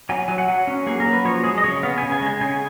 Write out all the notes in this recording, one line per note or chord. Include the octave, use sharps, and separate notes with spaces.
F#3 G#5
F#3 G#5
F#5
F#3
C#4
A#3 G#4
A#4
F#3
B4
F3 C#5
G#3 G#4
D#5
C#3 C#5
B3 F5
G#5
C#3
G#5
G#3
G#5
C#3 G#5